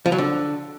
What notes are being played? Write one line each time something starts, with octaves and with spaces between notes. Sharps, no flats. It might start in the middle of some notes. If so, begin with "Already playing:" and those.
F3
F#3
D3